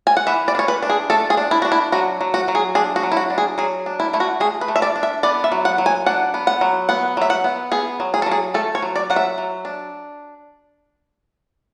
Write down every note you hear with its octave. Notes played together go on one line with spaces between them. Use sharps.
G#5
F#5
E3 E5
D5
D4
C#5
B4
D4
G#4
A3 A4
G#4
D4
E4
D4 F#4
E4
F#3 F#4
F#3
F#4
F#3
G#4
D4 G#4
F#4
F#3
E4
F#4
D4
G#4
F#3 G#4
D4
E4
A3 E4
F#4
A3 G#4
B4
A3
E5
D5
D4
E5
B3 D5
E5
F#3
F#5
F#3
G#5
D4 F#5
B3
F#5
F#3
B3 F#5
F#3 E5
F#5
B3
B3 G#4
F#3
G#4
A4
F#3
G#4
A3 A4
C#5
F#3
D5
F#3 F#5
E5
F#3
D4